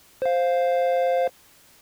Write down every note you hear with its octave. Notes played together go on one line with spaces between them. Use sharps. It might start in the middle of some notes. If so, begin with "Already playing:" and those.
C5 F5